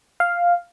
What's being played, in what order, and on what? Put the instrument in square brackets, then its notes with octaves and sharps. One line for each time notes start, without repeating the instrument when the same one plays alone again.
[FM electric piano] F5